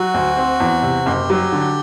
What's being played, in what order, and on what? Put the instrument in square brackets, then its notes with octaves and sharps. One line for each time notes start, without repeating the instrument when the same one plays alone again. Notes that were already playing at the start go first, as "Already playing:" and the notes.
Already playing: [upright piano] F#3 [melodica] F#4
[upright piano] D2
C4
E2
C3
[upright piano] F#1 [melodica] G4
[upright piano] F#3
D3